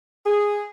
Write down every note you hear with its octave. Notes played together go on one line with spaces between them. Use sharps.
G#4